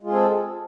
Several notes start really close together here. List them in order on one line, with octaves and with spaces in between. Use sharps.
G#3 F4 G#4 C4 A4